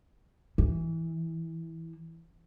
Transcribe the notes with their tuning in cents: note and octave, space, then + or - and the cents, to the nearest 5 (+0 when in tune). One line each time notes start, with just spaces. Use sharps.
E3 -10